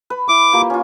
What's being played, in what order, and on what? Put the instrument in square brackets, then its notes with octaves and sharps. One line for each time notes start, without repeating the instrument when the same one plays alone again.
[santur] B4
[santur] E4 [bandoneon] D6
[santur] A#3 F4 G4
C#4 F4